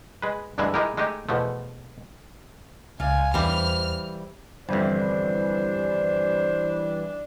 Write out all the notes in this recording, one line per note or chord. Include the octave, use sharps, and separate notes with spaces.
G#3 B4
D2 G2 E3 G#3 B4 E5
G#3 D#4 E4 G4 A#4
G#3 A3 D#4 G4
E2 B2 F3 A3
C#2 F4 D5 F5 G#5
E2 E3 G3 C5 F6
G1 F2 E3 G3 D4 C5